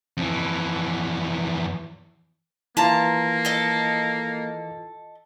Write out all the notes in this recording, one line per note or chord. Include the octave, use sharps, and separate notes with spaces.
F2 E3
E3 A#3 F4 A5 A#5
A4 D#5